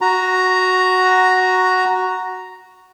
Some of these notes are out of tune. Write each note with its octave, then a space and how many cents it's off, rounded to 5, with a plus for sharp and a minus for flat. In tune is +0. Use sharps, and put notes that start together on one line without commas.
F#4 +0 A#5 +0